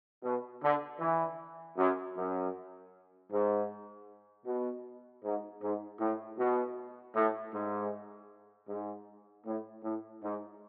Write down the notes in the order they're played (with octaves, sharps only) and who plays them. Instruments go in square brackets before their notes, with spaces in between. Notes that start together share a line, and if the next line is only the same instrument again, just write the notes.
[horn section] B2
D3
E3
F#2
F#2
G#2
B2
G#2
G#2
A2
B2
A2
G#2
G#2
A2
A2
G#2